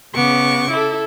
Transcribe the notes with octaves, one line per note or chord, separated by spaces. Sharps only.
C#3 B3 C#6 D6
E4 A4